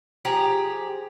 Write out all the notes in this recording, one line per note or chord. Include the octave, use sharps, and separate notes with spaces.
F3 G4 G#4 A#5